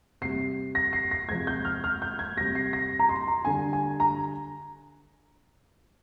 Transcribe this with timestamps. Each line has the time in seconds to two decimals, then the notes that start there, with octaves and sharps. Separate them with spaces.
0.21 C3 G3 C7
0.75 A#6
0.93 C7
1.11 A#6
1.29 C3 F3 G#3 G#6
1.47 G6
1.65 F6
1.84 F6
2.02 G6
2.19 G#6
2.37 C3 G3 A#6
2.55 C7
2.73 A#6
2.99 A#5
3.09 C6
3.28 A#5
3.45 D3 G3 G#5
3.73 G#5
4.00 A#5